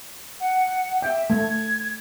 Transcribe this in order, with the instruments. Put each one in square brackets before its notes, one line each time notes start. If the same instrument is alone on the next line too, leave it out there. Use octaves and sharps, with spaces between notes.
[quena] F#5
[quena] E5 [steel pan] G5
[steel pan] A3 [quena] G#6